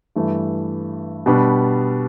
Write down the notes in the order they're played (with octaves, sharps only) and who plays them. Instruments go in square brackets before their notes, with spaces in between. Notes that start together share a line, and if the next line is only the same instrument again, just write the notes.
[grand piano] G2 E3 A3 D4
B2 G3 B3 D4